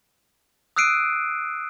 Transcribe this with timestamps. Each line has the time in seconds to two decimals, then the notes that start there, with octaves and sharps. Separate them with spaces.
0.76 D#6 E6 F#6 C7 D7 D#7